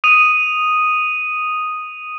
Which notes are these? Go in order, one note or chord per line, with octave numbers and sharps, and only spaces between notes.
D#6 D#7 F7